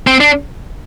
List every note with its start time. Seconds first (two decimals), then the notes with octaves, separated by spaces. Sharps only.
0.07 C4
0.21 D4